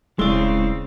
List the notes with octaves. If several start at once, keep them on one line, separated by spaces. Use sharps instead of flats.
D#1 C#3 G#3 C4 C#4 E4 D5